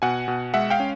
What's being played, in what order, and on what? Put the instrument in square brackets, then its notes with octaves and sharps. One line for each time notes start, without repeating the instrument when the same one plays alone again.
[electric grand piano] B2 F#5 G#5
B2
G#3 E5 F#5
F5 G5
C#4